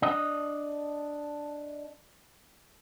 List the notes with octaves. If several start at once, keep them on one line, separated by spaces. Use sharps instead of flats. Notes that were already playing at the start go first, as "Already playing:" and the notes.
D4 D#5